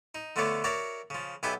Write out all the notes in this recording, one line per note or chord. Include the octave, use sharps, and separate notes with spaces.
D#4
D3 F3 A3 B3 C#5 D5
F#4 A#4 C#5 D5 E5
C#3 F3
B1 B3 G4 E5 G#5 B5